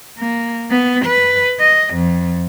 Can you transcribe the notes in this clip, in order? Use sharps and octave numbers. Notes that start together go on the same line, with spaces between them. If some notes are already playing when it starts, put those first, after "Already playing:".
A#3
B3
B4
D#5
F2